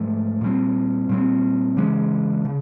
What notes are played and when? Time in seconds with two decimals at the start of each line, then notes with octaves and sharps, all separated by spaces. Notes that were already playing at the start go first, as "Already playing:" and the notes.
Already playing: G#2 F3 A3
0.41 A#2 G3 C4
1.09 A#2 G3 C4
1.77 C#3 E3 G#3 C#4
2.45 C#3